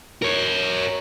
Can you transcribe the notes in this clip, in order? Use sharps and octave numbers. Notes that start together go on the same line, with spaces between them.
A#4 C#5